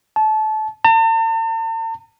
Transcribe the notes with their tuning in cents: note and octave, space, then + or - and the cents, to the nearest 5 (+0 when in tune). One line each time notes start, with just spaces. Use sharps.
A5 -25
A5 +45